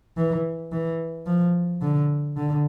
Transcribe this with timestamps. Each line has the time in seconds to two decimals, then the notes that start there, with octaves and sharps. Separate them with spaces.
0.17 E3
0.72 E3
1.26 F3
1.82 D3
2.37 D3